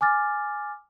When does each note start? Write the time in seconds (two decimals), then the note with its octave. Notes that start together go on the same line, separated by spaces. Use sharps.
0.01 G#5 D6 F6 A6